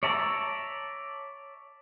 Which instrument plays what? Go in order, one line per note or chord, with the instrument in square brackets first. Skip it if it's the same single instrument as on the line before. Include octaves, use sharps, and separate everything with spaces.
[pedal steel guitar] C#5 D5 E5 A5 A#5